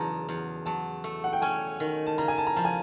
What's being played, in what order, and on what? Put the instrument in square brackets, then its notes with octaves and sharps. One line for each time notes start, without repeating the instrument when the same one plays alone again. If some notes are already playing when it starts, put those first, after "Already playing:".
Already playing: [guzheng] E2 C#3 F#3 [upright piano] A5 A#5
[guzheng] E2
[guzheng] F#3 [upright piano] A5
[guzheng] A3
[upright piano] F#5
G5
[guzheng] C#4 [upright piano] G#5
[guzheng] D#3
[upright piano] A5
[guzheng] C#3 [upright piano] A#5
[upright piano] G#5
A5
A#5
[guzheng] F3 [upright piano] A5
[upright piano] G#5